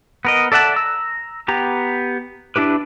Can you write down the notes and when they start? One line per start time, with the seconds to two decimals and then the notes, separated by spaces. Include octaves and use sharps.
0.25 B3 A#4 D#5
0.52 A4 D5 E5 F#5 A5
0.76 A#5 E6
1.48 B3 G4 A#5
2.56 D4 E4 G4 B4